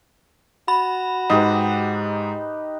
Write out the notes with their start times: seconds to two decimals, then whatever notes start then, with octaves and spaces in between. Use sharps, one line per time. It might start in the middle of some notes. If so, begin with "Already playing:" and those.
0.68 F#4 B5
1.30 G#2 D#4 G4 B4